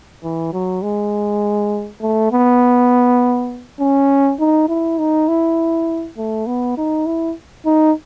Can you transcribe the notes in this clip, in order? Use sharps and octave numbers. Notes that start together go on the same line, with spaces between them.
E3
F#3
G#3
A3
B3
C#4
D#4
E4
D#4
E4
A3
B3
D#4
E4
D#4